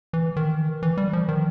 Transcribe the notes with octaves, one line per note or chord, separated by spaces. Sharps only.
E3
D#3
E3
G3
F3
D#3